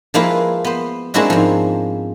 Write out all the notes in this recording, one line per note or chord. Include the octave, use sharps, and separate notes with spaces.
F3 G#3 A#3 E4 F4 B4
B3 C5
G#3 A#3 C4 D4 E4 F#4
G#2 F3